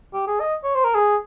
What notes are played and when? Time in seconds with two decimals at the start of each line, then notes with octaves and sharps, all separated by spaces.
0.14 G4
0.27 G#4
0.40 D#5
0.64 C#5
0.75 C5
0.84 A#4
0.95 G#4